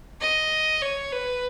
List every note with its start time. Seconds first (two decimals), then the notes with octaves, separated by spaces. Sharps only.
0.21 D#5
0.82 C#5
1.12 B4